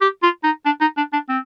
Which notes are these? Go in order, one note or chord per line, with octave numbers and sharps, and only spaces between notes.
G4
F4
D#4
D4
D#4
D4
D4
C4